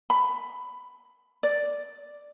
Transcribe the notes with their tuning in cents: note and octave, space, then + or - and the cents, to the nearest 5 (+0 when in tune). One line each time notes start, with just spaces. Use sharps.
B5 +10
D5 +0